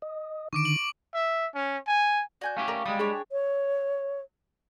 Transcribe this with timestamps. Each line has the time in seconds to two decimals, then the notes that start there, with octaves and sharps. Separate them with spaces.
0.02 D#5
0.53 D3 D#3 C#6 D6 D7
0.65 D7 F#7
1.14 E5
1.55 C#4
1.87 G#5
2.41 F#4 D5 G#5 G6
2.57 A3 C#4 G4 F5
2.68 A#4 D5
2.86 G3 G#3 D#6
2.99 D4 G4 G#4 C#5
3.32 C#5